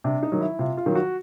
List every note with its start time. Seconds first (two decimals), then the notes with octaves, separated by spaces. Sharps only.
0.04 C3 D4
0.23 D#4
0.32 D#3 F#3
0.41 E4
0.59 C3 F4
0.77 F4
0.86 D#3 F#3
0.95 F#4